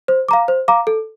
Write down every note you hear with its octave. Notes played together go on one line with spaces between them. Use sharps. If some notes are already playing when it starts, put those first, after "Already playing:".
C5
F5 A#5 D6
C5
F5 A#5 D6
A4